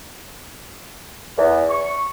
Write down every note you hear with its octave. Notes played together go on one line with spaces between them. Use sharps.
E2
C#6